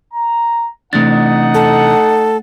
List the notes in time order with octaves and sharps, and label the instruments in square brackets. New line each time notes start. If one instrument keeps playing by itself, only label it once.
[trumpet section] A#5
[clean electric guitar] C3 E3 D4 [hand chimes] A3 A6 [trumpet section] D#4 F#5
[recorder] A4